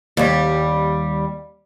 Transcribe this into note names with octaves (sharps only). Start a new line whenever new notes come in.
D#2 G3